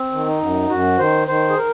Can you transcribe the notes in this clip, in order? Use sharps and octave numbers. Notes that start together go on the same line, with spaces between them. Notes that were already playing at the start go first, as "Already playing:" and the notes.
Already playing: C4
D#3
D#4
F#2
F#2 F#4
D#3 C5
D#3 C5
G#4
A#4